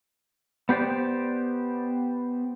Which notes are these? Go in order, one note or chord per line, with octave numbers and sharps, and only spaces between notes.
B3 G4 C5 D5